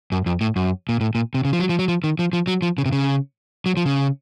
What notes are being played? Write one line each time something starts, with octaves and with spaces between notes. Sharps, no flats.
F#2
F2
A2
F#2
A#2
A2
A#2
C3
C#3
F3
F#3
F3
F#3
F3
D#3
F3
F3
F#3
F3
C#3
C3
C#3
F#3
F3
C#3